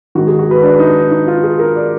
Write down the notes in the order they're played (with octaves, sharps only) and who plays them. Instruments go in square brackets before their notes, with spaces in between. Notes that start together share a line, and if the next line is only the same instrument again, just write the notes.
[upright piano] G#2 D#3 F#4
G#4
F#4
B4
D4
D#4
D#4
F4
G#4
A#4
D5